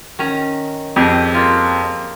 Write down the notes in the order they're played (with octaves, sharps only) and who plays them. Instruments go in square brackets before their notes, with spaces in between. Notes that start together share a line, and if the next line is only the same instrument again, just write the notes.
[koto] D#3 C#4 A#5
[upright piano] F2 [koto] G4 G#4 D#5
[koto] A#3 F4